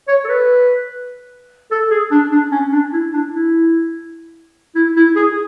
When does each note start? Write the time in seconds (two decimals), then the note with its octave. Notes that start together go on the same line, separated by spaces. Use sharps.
0.08 C#5
0.25 A4
0.29 B4
1.71 A4
1.91 G#4
2.11 D4
2.32 D4
2.52 C#4
2.73 D4
2.93 E4
3.13 D4
3.33 E4
4.75 E4
4.96 E4
5.16 G#4